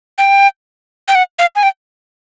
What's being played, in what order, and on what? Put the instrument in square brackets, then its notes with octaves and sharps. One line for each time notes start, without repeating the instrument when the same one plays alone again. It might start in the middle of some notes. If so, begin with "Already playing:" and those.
[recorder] G5
G5
F#5
F5
G#5
G5